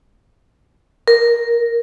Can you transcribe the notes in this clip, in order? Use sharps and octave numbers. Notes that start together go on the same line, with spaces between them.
A#4